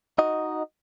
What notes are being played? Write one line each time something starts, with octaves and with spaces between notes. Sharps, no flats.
D#4 F#4 D#5